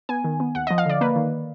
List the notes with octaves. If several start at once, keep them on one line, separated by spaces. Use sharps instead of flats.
B3 G#5
D#3
B3
D#2 F#5
F3 D#5
F5
D3 D5
A#3 B4
D#3